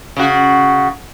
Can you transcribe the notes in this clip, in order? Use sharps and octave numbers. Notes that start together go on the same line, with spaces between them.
C#3 F#4